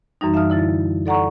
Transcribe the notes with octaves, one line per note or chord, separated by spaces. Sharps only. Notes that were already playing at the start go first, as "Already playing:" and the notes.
F#2 E3 G3 D#4
E5 F5 A5 D#6 F6
D3 E4 A6
A4 D5 F#5 A#5 C#6